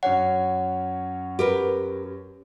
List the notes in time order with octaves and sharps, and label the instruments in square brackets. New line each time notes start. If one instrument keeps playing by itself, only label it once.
[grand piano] F#2 C#4 C#5 [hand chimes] F#5
[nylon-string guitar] G4 A#4 B4